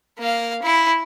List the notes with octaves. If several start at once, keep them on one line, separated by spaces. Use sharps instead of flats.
A#3 F5
E4